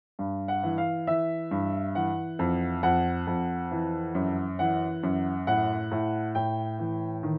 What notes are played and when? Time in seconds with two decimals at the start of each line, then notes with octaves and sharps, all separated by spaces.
0.19 G2
0.48 F#5
0.63 E3
0.78 F5
1.07 E3 E5
1.51 G2
1.95 E3 F#5
2.39 F2
2.83 F2 F#5
3.27 F2
3.71 E3
4.15 F#2
4.59 E3 F#5
5.03 F#2
5.47 A2 F#5
5.92 A2
6.35 A2 G5
6.79 E3
7.23 D#3